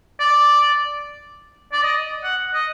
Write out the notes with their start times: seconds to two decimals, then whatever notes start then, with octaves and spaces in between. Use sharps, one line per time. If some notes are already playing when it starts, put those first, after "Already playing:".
0.20 D5
1.73 D5
1.83 D#5
2.24 F#5
2.54 D#5